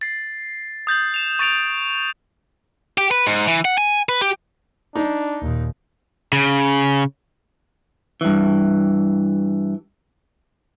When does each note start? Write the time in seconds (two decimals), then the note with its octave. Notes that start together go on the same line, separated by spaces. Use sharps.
0.01 A6 C7
0.87 D#6 G6 A6 F#7
1.14 E7 F7
1.39 C#6 A6 D7 F7
2.98 G4
3.11 B4
3.27 G#2
3.48 E3
3.65 F#5
3.78 G#5
4.09 B4
4.21 G4
4.96 D4 D#4
5.42 D#2 A#2
6.33 C#3
8.21 G2 E3